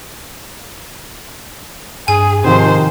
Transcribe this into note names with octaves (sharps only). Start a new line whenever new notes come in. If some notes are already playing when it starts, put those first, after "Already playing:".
G2 G#4 G#5
G#2 C3 D#3 F3 C5